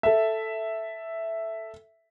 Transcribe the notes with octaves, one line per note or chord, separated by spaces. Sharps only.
A4 E5